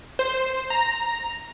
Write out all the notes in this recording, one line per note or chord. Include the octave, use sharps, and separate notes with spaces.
C5
A#5